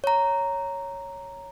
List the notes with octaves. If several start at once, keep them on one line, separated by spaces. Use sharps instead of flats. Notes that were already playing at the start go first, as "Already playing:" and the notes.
C#5 A#5